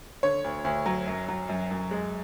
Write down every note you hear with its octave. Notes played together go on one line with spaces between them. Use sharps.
D3 C#5
D2
D2
F#3
F#2
F#3
F#2
F#2
G#3